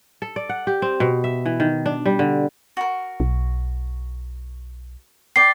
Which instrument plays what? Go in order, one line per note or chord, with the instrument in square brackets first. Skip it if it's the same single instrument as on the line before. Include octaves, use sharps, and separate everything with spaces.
[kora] A4
D5
F#5
G4
C4
B2
E5
E3
D#3
D4
G3
D3
[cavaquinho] F#4 A#4
[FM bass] B1
[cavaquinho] D5 G5 [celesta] C7